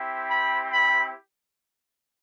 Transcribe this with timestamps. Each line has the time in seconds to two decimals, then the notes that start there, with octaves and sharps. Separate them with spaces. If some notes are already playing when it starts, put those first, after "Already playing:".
Already playing: C4 E4 G4
0.30 B5
0.73 B5